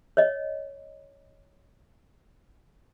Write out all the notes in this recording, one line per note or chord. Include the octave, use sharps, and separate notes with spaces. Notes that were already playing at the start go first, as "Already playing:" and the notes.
C#5 D#5